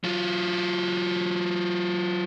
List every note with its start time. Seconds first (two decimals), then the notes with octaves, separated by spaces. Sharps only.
0.04 F#3 F4